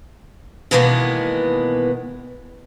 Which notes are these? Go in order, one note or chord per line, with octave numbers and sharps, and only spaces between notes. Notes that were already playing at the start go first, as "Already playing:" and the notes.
B2 D#3 E3 G#3 A#3 B3